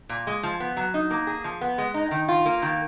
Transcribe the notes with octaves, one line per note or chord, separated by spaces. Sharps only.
A#2
G#3
F3
B3
F#3
D#4
A#3
G#4
F3
B3
G#3
D#4
D#3
F4
A#3
D#3